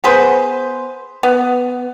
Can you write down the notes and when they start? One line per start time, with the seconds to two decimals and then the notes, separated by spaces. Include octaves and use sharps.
0.04 B3 G#4 B4 C5
1.23 B3